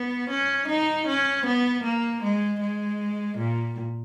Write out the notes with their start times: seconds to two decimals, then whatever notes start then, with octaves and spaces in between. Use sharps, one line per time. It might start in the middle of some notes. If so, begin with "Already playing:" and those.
Already playing: B3
0.30 C#4
0.68 D#4
1.08 C#4
1.46 B3
1.84 A#3
2.23 G#3
2.61 G#3
3.38 A#2